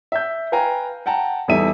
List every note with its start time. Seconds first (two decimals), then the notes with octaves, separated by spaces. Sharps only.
0.12 E5 G6
0.52 B4 F5 G5 G#5 A#5
1.06 F#5 G5 A5 A#5
1.48 E2 G3 D#4 A4 E5 D#7